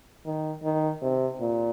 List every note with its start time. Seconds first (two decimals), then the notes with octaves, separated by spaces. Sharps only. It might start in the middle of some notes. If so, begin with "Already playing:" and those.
0.26 D#3
0.63 D#3
1.02 C3
1.40 A#2